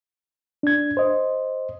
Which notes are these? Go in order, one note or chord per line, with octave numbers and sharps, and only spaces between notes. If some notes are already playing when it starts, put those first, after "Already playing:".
D4 G#6
C5 D#5